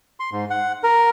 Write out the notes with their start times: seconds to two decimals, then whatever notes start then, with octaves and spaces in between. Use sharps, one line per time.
0.20 C6
0.32 G#2
0.50 F#5
0.84 A#4